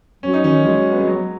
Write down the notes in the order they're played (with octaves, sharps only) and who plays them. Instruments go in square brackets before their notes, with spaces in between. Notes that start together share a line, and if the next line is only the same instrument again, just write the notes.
[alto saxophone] F#3 [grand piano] C#4
[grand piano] D#4
[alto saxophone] D#3 [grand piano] C#4
[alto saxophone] F#3 [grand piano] G#3
[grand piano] B3
G#3
F#3